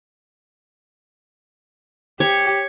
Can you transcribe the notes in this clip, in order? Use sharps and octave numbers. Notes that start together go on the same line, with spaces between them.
G4 C#5